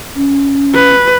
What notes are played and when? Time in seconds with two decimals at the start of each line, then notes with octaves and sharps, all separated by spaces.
0.16 C#4
0.75 B4